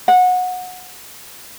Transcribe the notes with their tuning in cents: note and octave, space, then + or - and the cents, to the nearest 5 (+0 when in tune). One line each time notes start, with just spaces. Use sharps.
F#5 -20